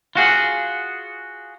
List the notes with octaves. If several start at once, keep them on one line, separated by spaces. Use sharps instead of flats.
F4 F#4 G#4 F#5